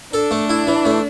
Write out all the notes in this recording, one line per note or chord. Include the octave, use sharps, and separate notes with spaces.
D4 A4
A3
E4
E3
A3